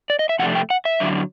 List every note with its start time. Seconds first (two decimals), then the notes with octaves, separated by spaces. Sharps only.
0.10 D5
0.19 D#5
0.29 E5
0.39 C3 F3 A3 D4 F#5
0.55 G5
0.70 F#5
0.85 E5
1.00 F#2 D3 F#3